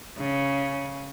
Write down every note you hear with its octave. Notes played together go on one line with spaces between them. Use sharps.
C#3